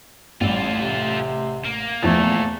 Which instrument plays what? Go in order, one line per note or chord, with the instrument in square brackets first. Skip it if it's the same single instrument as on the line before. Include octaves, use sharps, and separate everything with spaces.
[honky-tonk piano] A1 [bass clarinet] G3 [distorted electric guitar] F4 A4
[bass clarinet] C3
[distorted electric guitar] A#3
[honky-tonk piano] E2 F3 A6 [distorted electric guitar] A#2 [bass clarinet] A3